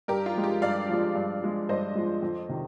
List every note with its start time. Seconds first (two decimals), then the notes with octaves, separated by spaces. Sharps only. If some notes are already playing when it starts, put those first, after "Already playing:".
0.08 G2 G4 A#4
0.26 F4
0.35 F3 G#3
0.44 G4
0.62 G2 D5 F5
0.89 F3 G#3
1.15 G2
1.42 F3 G#3
1.69 G2 C5 D#5
1.95 F3 G#3
2.22 F2
2.49 C3 D#3